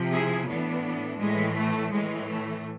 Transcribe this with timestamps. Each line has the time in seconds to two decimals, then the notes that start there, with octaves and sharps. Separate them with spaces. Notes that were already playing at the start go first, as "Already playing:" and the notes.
Already playing: C3 F3
0.11 E4 G#4
0.47 A2 E3 B3 D4
1.20 A2 E3 G#3
1.56 A3
1.92 A2 E3 G#3
2.29 A3